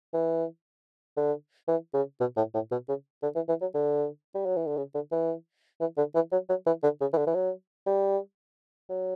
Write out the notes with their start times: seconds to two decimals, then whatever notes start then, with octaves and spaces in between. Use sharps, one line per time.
0.14 E3
1.17 D3
1.68 E3
1.94 C#3
2.20 B2
2.37 A2
2.54 A2
2.71 B2
2.89 C#3
3.23 D3
3.35 E3
3.48 E3
3.61 F#3
3.75 D3
4.35 G3
4.46 F#3
4.56 E3
4.67 D3
4.77 C#3
4.95 D3
5.12 E3
5.81 E3
5.97 D3
6.15 E3
6.32 F#3
6.50 F#3
6.67 E3
6.83 D3
7.01 C#3
7.13 E3
7.18 D3
7.27 E3
7.35 F#3
7.87 G3
8.90 F#3